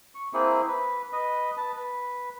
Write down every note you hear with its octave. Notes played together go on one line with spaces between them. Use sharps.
C#6
A#3 C4 E4 G#4
B4
B4 D#5
B4 A5
B4